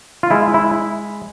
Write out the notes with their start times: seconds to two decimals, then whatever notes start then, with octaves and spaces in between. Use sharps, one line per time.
0.23 F4
0.31 G#3 E4
0.54 E4